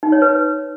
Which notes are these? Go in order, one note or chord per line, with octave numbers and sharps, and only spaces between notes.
D#4
C#5
B4